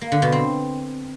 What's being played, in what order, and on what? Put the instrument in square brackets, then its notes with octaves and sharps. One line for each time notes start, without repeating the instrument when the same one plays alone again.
[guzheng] A#3
D3
B2
C4